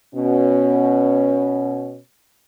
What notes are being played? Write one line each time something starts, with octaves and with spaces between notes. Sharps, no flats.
B2 C#4